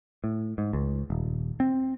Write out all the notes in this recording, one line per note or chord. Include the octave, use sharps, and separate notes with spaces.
A2
G#2
C#2
D#1
C4